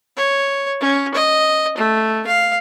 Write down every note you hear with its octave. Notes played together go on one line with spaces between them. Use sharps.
C#5
C#4
D#5
A3
F5